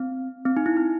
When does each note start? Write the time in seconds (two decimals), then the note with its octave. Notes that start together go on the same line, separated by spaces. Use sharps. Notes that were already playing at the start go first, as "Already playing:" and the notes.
Already playing: C4
0.45 C4
0.57 D#4
0.66 E4
0.77 D#4